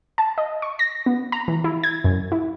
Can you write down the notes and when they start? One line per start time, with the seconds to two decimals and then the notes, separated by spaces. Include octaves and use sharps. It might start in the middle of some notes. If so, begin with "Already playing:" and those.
0.18 A5
0.38 D#5
0.62 C#6
0.79 A#6
1.06 B3
1.32 A#5
1.48 E3
1.64 E4
1.84 G#6
2.04 F#2
2.32 E4